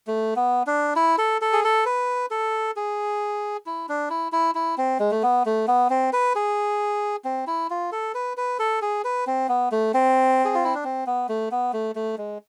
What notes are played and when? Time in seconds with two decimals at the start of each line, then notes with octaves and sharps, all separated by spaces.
0.07 A3
0.36 B3
0.67 D4
0.96 E4
1.18 A4
1.41 A4
1.53 G#4
1.64 A4
1.86 B4
2.31 A4
2.76 G#4
3.66 E4
3.89 D4
4.10 E4
4.32 E4
4.55 E4
4.78 C4
4.99 G#3
5.11 A3
5.23 B3
5.46 A3
5.68 B3
5.90 C4
6.13 B4
6.35 G#4
7.24 C4
7.47 E4
7.70 F4
7.92 A4
8.14 B4
8.37 B4
8.59 A4
8.82 G#4
9.04 B4
9.27 C4
9.49 B3
9.72 A3
9.94 C4
10.45 G#4
10.54 F4
10.64 E4
10.75 D4
10.84 C4
11.07 B3
11.29 A3
11.51 B3
11.73 A3
11.95 A3
12.18 G#3